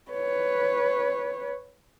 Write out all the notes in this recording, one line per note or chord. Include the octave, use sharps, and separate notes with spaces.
B4 C#5